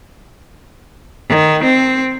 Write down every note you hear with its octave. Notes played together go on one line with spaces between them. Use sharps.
D#3
C4